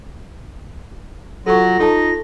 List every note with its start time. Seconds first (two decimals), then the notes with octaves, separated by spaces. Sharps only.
1.46 F#3 F4 A4 C#6 A#6
1.79 D#4 A4 A5